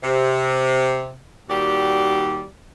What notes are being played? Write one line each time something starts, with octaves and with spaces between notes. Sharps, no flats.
C3
D#2 G3 F#4 G4 D5